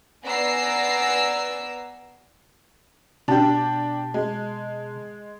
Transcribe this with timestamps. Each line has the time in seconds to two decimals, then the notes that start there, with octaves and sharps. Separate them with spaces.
0.24 B3 D5 G#5 A#5 E6 C7
3.28 B2 D4 G4 A5
4.14 G#3